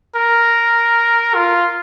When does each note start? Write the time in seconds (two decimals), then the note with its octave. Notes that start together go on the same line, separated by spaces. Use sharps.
0.16 A#4
1.35 F4